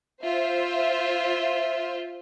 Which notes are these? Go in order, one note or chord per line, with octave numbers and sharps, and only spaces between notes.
F4 C5 E5